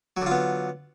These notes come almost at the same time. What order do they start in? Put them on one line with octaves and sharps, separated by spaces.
F#3 D3 F4 B3